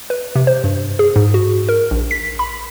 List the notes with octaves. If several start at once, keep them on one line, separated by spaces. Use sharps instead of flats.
B4
C3
C5
G2
G#4
G#2
F#4
A#4
A#1
B6
B5